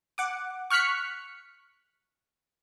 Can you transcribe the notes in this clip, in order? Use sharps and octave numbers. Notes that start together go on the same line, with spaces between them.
F#5 D6
C#6 F6 F#6 B6 C#7